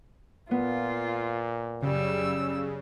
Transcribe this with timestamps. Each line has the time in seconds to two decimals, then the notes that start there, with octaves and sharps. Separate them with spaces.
0.51 A#2 B3 F4
1.82 F#2 C#3 G3 E6